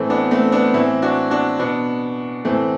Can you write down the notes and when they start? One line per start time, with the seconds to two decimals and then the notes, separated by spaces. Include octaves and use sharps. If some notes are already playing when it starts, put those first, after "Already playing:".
Already playing: A2 E3 A3 C4
0.10 B3 D4
0.31 A3 C4
0.52 B3 D4
0.74 A2 E3 C4 E4
1.02 D4 F#4
1.31 D4 F#4
1.59 B2 B3 D4
2.45 A2 E3 A3 C4